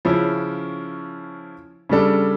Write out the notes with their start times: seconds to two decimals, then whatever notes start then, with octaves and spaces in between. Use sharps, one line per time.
0.05 C#3 F3 C#4 E4
1.89 C#3 G3 D4 A4